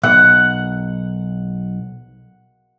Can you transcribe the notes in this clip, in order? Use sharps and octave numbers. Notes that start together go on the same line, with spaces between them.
B1 F#5